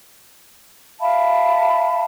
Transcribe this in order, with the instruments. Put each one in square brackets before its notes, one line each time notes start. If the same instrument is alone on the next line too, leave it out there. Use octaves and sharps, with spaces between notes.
[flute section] E5 F5 A5 B5